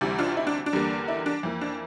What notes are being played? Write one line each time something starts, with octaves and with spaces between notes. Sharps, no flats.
D2 C3 E3 G3
D4 F4
E4
D4
D4
E2 D3 G3 A#3
E4
D4
F2 E3 A#3
D4